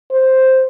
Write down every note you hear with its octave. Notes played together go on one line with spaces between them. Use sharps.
C5